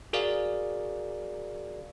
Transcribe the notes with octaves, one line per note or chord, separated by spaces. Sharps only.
F#4 G#4 A#4 D5 F5